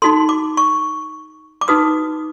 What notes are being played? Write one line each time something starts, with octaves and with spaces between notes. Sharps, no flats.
D#4 F#4 A4 C6
D6
C#6
D6
D#4 F#4 B4 D#6